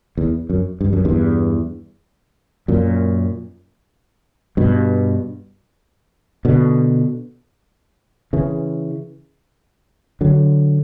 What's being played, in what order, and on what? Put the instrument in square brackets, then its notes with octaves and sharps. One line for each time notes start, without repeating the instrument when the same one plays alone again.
[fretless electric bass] E2
F#2
G2
F#2
E2 G2
F#2 A#2
G2 B2
B2 D3
C#3 E3
D3 F#3